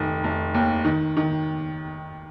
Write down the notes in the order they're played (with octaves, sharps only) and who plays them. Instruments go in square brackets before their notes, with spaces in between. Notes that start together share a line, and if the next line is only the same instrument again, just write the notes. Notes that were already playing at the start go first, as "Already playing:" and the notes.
Already playing: [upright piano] F1 D#3
F1
D#2
D#3
D#3